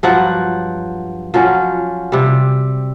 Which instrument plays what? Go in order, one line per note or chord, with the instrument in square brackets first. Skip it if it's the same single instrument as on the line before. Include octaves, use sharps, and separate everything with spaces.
[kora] G2 F3 F#3 F#5
F3 F#3 C#4
C3 G3